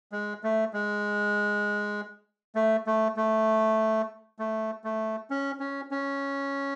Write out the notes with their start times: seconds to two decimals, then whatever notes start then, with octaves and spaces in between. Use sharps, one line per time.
0.12 G#3
0.43 A3
0.73 G#3
2.55 A3
2.87 A3
3.17 A3
4.39 A3
4.84 A3
5.30 C#4
5.60 C#4
5.91 C#4